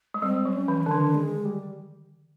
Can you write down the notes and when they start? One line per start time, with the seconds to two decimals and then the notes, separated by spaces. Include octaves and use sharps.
0.14 G#3
0.22 G3 C4
0.45 F#3
0.53 C#4
0.68 E3
0.84 D3 D4
0.91 D#3
1.15 G#3
1.45 G3